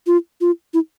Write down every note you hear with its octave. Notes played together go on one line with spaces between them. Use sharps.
F4
F4
E4